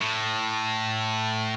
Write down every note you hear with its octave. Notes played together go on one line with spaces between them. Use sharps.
A2